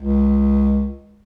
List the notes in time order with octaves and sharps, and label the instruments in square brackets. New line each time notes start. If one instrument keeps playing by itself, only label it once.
[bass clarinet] C#2